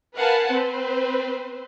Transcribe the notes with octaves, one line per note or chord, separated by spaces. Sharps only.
A#4 B4 F5 F#5 G#5 A5
C4 B4 C5